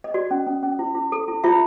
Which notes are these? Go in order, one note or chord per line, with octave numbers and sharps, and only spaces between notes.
D#5
F#4 D5
C#4
C#4
C#4
E4
E4
A4
E4
E4 F4 E5